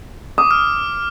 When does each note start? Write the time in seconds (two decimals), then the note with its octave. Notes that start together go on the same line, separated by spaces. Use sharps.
0.38 D6 D#6
0.51 F6